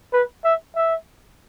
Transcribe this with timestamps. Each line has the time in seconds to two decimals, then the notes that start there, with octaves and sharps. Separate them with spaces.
0.13 B4
0.44 E5
0.76 E5